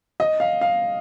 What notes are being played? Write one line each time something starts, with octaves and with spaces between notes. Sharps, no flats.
D#5
F5
F5